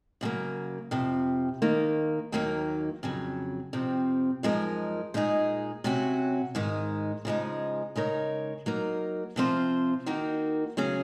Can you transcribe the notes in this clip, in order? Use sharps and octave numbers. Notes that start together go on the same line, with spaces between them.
F#2 C#3 F#3 A#3
F2 C3 F3
D#2 D#3 A#3
D#2 D#3 F#3 A#3 D#4
F2 C#3 F#3
F2 C3 F3 C4
F#2 F3 G#3 D#4 A#4
A#2 G#3 D#4 G#4
C3 F#3 C#4 F#4
G#2 D#3 G#3 D#4
C#3 F3 G#3 D#4
C#3 G#3 D#4 A#4 C#5
F#3 A#3 D#4 A#4
C3 F3 C4 F4 C5
D#3 A#3 D#4 F#4
C#3 F#3 C#4 G#4